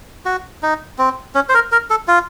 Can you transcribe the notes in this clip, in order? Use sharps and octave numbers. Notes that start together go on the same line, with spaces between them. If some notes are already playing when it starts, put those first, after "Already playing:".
F#4
D#4
C4
C#4
C5
A#4
A#4
A4
F4